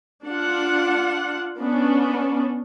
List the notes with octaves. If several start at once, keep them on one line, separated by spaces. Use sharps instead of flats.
D4 F4 F#5
B3 C#4 D4